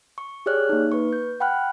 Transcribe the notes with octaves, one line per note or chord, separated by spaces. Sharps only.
C#6
G4 G#4 C#5 D5 F6 F#6
A#3 D#4
B4 C#6
G6
F#5 G5 B5 F6 F#6